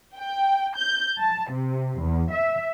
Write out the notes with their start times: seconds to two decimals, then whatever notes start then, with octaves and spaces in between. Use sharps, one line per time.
0.18 G5
0.77 G6
1.19 A5
1.51 C3
1.99 E2
2.32 E5